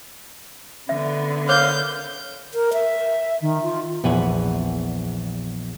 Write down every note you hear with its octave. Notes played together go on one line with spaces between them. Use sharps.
D3 B3 E5
A#4 C#5 F5 D6 G6
A#4
E5
D#3
F4
A#1 E2 B4 F#5 G#5